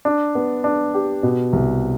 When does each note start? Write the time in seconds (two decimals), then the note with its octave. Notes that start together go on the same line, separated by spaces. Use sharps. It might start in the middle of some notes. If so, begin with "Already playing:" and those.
0.05 D4
0.35 B3
0.64 D4
0.94 G4
1.23 B2
1.53 C2